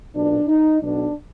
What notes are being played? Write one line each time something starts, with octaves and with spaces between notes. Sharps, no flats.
B1 A#2 D4
D#4
B1 B2 D4